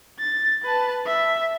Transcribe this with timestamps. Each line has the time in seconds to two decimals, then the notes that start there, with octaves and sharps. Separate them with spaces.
0.19 A6
0.64 B4 A5
1.07 E5